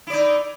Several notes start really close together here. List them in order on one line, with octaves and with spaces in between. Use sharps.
E4 D5 D#4